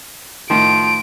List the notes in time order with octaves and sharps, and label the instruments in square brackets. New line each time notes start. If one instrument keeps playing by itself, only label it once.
[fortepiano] A2 D#3 [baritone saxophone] F3 [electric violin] D7